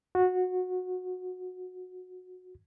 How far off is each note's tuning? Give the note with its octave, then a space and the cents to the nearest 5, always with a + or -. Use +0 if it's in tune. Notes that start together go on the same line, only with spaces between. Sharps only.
F#4 -20